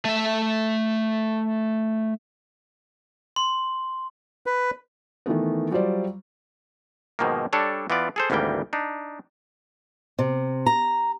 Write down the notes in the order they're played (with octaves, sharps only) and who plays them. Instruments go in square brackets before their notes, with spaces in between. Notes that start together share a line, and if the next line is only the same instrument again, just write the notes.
[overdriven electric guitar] A3 E5
[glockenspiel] C6
[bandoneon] B4
[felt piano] D#3 E3 A3 B3
F#3 G3 F4 C5 D5
[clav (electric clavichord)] G#2 B2 D#3 F3 A#3
G3 D4 A4 C#5
E3 B3 F4 D5
G#4 A4 C5
G#1 D2 E3 G3 A#3 G5
D4 D#4
[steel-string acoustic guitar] C3
A#5